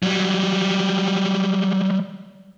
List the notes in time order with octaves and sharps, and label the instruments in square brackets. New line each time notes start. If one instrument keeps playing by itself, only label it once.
[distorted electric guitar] F#3 G3